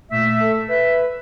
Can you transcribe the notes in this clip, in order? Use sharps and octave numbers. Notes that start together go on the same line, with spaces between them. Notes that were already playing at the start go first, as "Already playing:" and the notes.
A#2 A3 E5
A4
B4 E5